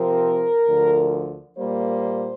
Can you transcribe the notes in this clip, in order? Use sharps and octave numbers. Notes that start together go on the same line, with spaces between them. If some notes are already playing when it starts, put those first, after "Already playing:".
Already playing: C3 F3 C4 A#4
D2 D3 F3
A#2 G3 A#3 C5